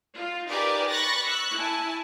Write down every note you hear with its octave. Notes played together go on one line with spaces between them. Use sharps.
F4
D#4 G4 G#4 A#4 B4 D5
B5 C#6 F#6 A6 A#6
C#6 E6 F#6
E4 G#5 A5